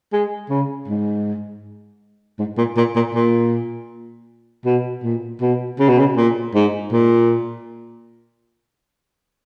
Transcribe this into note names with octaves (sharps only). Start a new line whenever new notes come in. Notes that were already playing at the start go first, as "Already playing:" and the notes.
G#3
C#3
G#2
G#2
A#2
A#2
A#2
A#2
B2
A#2
B2
C#3
B2
C#3
A#2
G#2
A#2